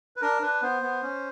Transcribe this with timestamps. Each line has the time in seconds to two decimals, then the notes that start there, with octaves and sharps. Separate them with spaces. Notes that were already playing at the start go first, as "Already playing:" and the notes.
0.16 B4
0.21 D4 A#4
0.42 D4 B4
0.62 B3 C5
0.83 B3
1.03 C#4